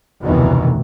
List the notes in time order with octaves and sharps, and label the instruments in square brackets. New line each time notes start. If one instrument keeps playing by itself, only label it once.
[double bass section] F1 D2 B2 D#3 E3 B3